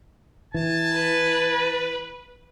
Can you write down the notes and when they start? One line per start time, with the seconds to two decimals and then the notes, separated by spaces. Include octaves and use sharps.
0.54 E3 G#5 A5
0.96 B4